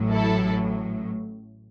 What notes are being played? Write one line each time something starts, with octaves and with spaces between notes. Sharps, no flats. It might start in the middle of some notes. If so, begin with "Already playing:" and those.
Already playing: A1 A2 F#3
E4 A4